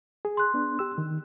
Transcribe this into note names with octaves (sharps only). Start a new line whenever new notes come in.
G#4
C6 F#6
B3 D4
G4 E6
D#3